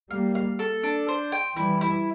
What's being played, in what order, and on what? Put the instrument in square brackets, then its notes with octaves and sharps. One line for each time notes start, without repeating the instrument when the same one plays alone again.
[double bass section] G3 A#3 [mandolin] F5
[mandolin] F5
A4
D4
C5
G5
[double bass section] E3 G3 [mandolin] E4
[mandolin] E4